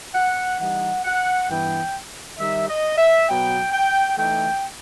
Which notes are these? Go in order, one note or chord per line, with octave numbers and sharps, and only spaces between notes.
F#5
E3 G3 D#4 F#5
F#5
G2 E3 B3 G5
D#3 G3 D#4 E5
D#5
E5
B2 F#3 B3 G5
G5
E3 A3 D#4 G5